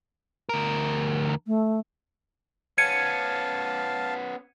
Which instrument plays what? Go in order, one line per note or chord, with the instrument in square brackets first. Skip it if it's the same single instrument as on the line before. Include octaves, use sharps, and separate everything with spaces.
[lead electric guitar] D2 A#4
[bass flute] A3
[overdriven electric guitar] B3 C#4 [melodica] F5 A5 [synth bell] G#6 C#7 D#7